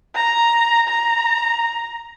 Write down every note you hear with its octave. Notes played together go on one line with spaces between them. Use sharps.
A#5
A#5